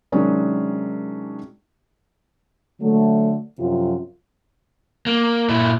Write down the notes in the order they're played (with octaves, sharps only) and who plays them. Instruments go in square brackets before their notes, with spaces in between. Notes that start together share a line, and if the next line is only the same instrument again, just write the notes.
[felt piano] C3 D#3 F#3 G#3 C#4 D4
[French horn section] D3 F#3 A3
F#2 C3 F3 F4
[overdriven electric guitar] A#3
A#2 E4